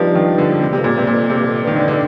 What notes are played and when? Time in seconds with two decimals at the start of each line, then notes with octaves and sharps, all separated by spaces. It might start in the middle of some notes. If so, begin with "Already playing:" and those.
Already playing: G2 F3 G3 C4 D4 D#4
0.15 D#3
0.38 D3
0.52 D3
0.61 G2 C3
0.73 C3
0.78 F2
0.84 A#2
0.96 G2 C3
1.07 A#2
1.12 F2
1.30 F2 C3
1.38 G2
1.47 F2
1.64 G2 D#3
1.76 D3
1.88 D3